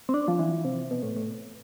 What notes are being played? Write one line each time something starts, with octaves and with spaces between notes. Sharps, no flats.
C4
D4
F3
E3
C3
B2
A2
A2